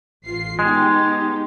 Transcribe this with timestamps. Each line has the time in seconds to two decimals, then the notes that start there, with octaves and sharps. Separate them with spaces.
0.25 A1 F4 C7
0.59 G#3 B3 D#4 G4